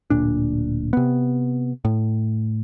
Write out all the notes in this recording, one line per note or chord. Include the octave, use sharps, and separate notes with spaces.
D1 A#2 D4
C3 B3
A2